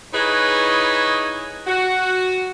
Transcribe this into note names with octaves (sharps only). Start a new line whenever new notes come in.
D#4 E4 G#4 B4 C#5 D#5
F#4